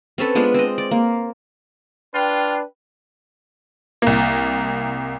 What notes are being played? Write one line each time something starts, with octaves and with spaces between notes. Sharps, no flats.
C4 C#4 A4 B4
G#3 B3 D4 F4
C4 D#5
D5
A#3
D4 F4 B4 G5
C2 A#3